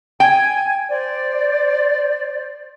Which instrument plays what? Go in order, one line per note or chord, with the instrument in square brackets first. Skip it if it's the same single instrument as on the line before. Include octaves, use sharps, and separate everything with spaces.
[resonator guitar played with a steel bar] G5 [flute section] G#5 G#6
[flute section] C5 D5